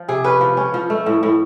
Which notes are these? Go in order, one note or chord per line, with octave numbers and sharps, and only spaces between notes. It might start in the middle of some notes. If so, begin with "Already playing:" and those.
Already playing: F3
C3 G#4
C#4 B4
F3
C#4
F3
A3
A2
A2